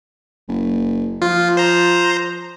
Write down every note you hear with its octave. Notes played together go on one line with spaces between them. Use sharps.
F#1
F3 F4
C5 A#5